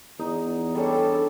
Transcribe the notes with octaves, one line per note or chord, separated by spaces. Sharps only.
E2 D#4
G3 C#4 D4 A4